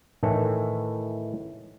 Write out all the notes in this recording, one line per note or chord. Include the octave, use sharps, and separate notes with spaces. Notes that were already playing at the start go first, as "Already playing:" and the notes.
A2 D#3 E3 A3